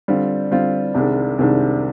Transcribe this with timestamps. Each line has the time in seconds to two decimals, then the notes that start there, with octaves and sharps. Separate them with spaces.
0.08 D3 G3 C4 F4
0.51 D3 G3 C4 F4
0.94 C2 C3 D#3 G#3 D4
1.38 C2 C3 D#3 G#3 D4